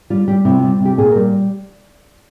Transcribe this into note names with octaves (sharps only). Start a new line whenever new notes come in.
G3 F4
G3 G4
C3 E4
F4
G3
C3
G4
A#2 G#4
A#4
G3